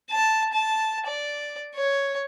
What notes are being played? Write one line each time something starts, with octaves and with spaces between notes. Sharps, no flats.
A5
A5
D5
C#5